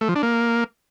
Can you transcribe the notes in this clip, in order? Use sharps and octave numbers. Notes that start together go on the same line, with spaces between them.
A3
F3
D4
A#3